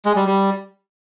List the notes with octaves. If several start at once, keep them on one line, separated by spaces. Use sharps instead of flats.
G#3
G3
G3